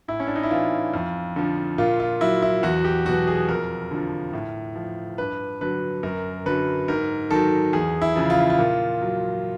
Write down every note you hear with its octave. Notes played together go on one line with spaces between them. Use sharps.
A2 E4
C#4
D4
D#4
E4
E3 F4
F2
D3 F3
A#2 F4
F4
F#3 E4
E4
E2 F#4
G4
B2 F#3 F#4
G#4
F2 A#4
D3 F3
A2
F3
G2 B4
D3 F#3 B4
F#2 A#4
D3 F#3 B4
G#2 A#4
D#3 F#3 A4
E2 G#4
E4
C#3 F3
F4
E4
F4
A#2
F#3